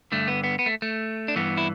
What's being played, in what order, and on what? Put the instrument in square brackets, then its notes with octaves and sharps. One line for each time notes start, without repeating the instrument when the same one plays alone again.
[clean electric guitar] G2 D3 A3
B3
B3
B3
A3
A3
D4
G2 E3 B3
E4